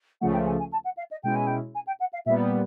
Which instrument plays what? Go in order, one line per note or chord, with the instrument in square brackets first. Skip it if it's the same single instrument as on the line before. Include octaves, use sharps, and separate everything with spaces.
[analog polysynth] C#2 C#3 F3 A3 [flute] F#5
[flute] G5
G#5
G#5
A5
F#5
F5
D#5
[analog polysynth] B2 G#3 C#4 E4 [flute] G5
[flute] G#5
G5
G#5
G5
F#5
F5
[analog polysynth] A#2 G3 B3 [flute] E5